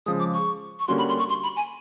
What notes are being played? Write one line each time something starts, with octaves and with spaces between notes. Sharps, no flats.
C#3 F3 G#3 D#6
D6
C#6
C#6
D3 G3 A#3 C#4 F#4 C6
B5
C6
C#6
C6
B5
G#5